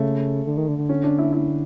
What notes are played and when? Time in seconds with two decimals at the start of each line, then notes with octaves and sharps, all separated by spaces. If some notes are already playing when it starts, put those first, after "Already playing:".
Already playing: C#3 A3
0.47 D3
0.57 D#3
0.68 D3
0.78 D3
0.89 C#4
1.04 D4
1.18 E4
1.33 E4